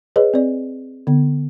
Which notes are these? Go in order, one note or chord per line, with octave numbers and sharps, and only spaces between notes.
G#4 B4 C#5 D#5
C4 D5
D3 B3